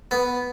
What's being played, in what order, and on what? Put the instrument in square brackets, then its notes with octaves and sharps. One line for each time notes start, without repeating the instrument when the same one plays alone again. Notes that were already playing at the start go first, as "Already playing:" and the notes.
[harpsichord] B3